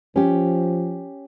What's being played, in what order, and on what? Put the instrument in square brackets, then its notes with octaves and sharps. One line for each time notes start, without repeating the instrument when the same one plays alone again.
[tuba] F3 [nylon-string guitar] C#4 G4